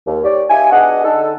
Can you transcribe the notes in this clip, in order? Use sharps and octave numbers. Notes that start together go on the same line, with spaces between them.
D#2
G4 C#5 D5
D#4 F4 G4 E5 G#5
B2 D4 G#4 D#5 F#5
D3 D#4 A4